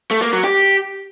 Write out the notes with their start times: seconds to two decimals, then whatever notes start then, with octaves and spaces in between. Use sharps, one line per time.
0.11 A3
0.22 A#3
0.33 F#3
0.44 G4